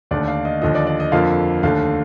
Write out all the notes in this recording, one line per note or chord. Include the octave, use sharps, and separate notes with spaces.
D#2 D3 A3 D5
F5
D#5
D#2 D3 F3 D#5
D5
D5
D#5
F2 D3 F3 A#3 F5
D#2 D3 A3 F5